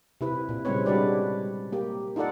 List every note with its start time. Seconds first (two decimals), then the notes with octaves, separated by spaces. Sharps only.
0.21 C3 E4 B4
0.49 A#2
0.65 C#3 G3 G#3 C4 B4 C#5
0.86 G3 D4 F#4 G4 B4 D5
1.72 A#3 G4
2.16 D#4 F4 A4 D5 F#5